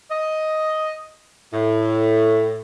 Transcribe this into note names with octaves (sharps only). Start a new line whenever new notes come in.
D#5
A2